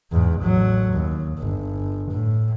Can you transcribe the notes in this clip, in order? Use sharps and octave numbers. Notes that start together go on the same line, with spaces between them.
E2 G#2
A1 F#3
D#2
G1
A2